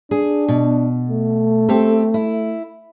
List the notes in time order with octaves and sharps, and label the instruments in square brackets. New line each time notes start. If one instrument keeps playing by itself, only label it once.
[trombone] D4 [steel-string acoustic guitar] G#4
[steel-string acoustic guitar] B2
[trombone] A3
[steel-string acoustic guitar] C4 G4 A4
E4